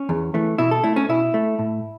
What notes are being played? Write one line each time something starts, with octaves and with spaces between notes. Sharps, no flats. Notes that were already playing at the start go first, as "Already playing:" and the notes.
Already playing: C#4
E2
E3 A3
B2 E4
A4
A3 E4
C#4
B2 E4
A3
A2